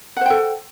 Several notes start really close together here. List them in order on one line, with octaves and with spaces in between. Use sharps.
F#5 C5 G5 A4